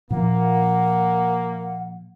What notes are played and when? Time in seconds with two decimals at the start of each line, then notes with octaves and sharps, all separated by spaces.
0.11 A#2 F3 A#3 F#5